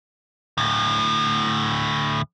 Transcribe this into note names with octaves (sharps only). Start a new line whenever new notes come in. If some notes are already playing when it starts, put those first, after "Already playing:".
D2 A2